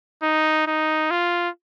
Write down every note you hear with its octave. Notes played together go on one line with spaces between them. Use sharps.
D#4
D#4
F4